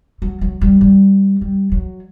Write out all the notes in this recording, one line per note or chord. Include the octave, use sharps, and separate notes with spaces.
F#3
F#3
G3
G3
G3
F#3